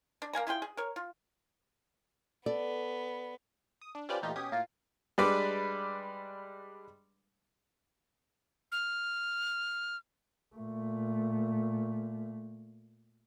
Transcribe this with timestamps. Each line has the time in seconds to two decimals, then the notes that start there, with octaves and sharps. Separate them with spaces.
0.22 D4
0.33 A#3 F5 G#5 A#5
0.47 E4 F4 G#4 G5
0.62 G#4
0.77 A#4 C#5
0.96 F4
2.46 B3 A4 D5
3.81 D#6
3.95 D4
4.09 C#4 F4 G4 B4 C5 D5
4.22 A#2 E3 A3 D#4 F4 G4
4.36 B2 C#4 G4 D#6 G#6
4.51 A2 A#3 F4
5.18 G3 G#3 D4 B4 D5
8.72 F6
10.56 A#2 A3